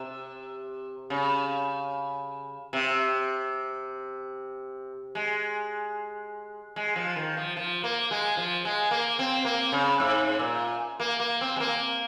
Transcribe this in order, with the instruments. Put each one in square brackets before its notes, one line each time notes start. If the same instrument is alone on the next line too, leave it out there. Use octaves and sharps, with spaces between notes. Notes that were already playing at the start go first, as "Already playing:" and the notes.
Already playing: [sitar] C3
C#3
C3
G#3
G#3
F3
D#3
F3
F3
A#3
G#3
F3
G#3
A#3
C4
A#3
C#3
G#2
A#2
A#3
A#3
C4
G#3
A#3